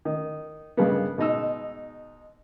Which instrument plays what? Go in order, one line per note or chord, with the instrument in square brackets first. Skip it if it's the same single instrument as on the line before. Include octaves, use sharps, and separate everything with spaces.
[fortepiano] D#3
G2 C#3 G#3 A#3 B3
G#2 B2 D#4 E6